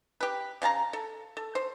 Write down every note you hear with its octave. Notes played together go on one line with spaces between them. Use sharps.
G4 B4
C#3 F5 A5 A#5
A4
A4
C5